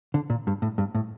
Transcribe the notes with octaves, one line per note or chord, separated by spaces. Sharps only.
D3
A#2
G2
A2
G2
A2